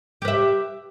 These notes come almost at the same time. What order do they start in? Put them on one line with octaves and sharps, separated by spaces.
G4 B4 E5